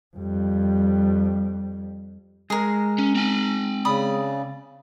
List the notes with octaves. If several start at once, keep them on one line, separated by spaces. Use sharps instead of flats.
F2 G3
G#3 G#4 A#4
C#4
C4 G#5
C#3 D5 B5 D#6